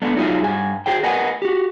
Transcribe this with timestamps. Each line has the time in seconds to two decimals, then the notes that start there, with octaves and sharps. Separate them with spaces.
0.02 G#3 A3 B3 D4
0.16 F#3 D#4 F4 G#4 E5
0.42 G2 G#5
0.86 F#4 G#4 C5 G5
1.03 A#4 B4 D#5 F#5 G#5
1.42 F#4 G4